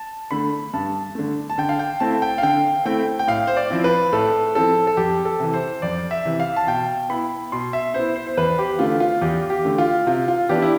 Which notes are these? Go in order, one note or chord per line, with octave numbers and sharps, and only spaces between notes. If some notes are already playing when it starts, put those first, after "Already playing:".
Already playing: A5
D3 A3 B5
G2 A5
D3 A3
A5
D3 G5
F5
G5
A3 C4 E4 A5
G5
F5
D3 G5
A3 C4 E4 G5
G5
A2 F5
C5
D5
F3 C4 E4
B4
A2 A4
F3 C4 E4 A4
A4
F2 G4
A4
C3 E3
C5
F2 D5
E5
C3 E3
F5
A5
B2 G5
B3 E4 B5
B2 C6
E5
B3 E4 C5
C5
C5
E2 B4
G4
D3 A3 F4
F4
E2 G4
G4
D3 A3
F4
C3 F4
F4
E3 B3 D4 G4
E4